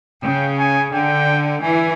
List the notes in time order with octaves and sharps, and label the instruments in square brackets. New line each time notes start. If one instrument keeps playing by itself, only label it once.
[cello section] C#3 [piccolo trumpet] G5
[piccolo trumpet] G#5
[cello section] D3 [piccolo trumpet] G5
[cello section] E3 [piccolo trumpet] G#5